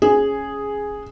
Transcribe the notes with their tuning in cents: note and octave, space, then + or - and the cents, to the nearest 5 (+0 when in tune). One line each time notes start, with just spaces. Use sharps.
C#4 +0 G#4 +0